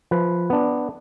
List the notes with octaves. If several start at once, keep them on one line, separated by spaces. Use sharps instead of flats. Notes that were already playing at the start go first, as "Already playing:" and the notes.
F3 B4
B3 D4